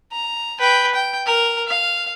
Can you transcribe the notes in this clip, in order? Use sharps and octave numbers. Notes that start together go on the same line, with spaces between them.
A#5
B4 G5
G5
A#4
F5